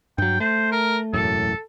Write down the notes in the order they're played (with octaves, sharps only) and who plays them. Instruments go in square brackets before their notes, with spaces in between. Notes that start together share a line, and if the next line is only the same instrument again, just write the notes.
[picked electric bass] G2 F#3 [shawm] G5
[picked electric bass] A3 [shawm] C5
[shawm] A#4
[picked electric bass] E1 F#2 A2 [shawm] A4